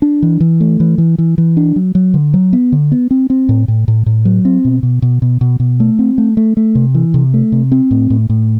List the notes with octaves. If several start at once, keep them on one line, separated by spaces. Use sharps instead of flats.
D4
E3
E3
A3
E3
E3
E3
E3
D4
F#3
F#3
D3
F#3
B3
D3
B3
C4
C4
A2
A2
A2
A2
F#3
C4
B2
B2
B2
B2
B2
B2
A3
C4
A3
A3
A3
C3
E3
C3
A3
C3
C4
A2
A2
A2